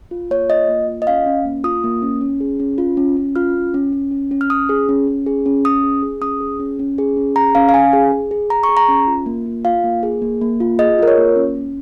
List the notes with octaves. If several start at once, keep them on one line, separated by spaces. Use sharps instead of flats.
F4
A#3 C#5
F4 D#5
A#3
F4
D#5
C#4 F5
C#4
A#3
F4 D#6
A#3
C#4
C#4
G#4
C#4
F4
C#4
C#4
F4 F6
C#4
C#4
C#4
C#4
C#4
F6
C#4 D#6
G#4
C#4
C#4
G#4
C#4
C#4 D#6
G#4
G#4
C#4 D#6
G#4
C#4
C#4
G#4
C#4
G#4 A#5
C#4 F5
F5
C#4 G#5
G#4
G#4
G#4
G#4 A#5
C#6
G#4
A#5
C#4
F4
A#3
F4
F4 F5
A#3
G#4
A#3
A#3
F4
G#4 D#5
F4 A#4
C#5
A#3
C#4
C#4